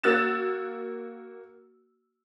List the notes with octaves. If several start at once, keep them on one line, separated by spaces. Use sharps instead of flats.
A#3 F#4 E6 F#6 A6 E7